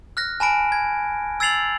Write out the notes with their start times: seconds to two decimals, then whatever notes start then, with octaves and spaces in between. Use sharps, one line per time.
0.17 F6 F#6 A#6
0.40 G#5 A5 B5 D7
0.72 G#6
1.40 E6 G#6 A6 C7 F7 F#7